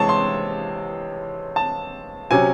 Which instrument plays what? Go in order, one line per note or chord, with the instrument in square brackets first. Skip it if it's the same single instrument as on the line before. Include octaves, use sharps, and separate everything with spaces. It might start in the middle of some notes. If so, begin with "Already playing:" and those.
Already playing: [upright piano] C3 E3 G#3 C#5 A5
C6
A5
C3 F#3 C#4 G#5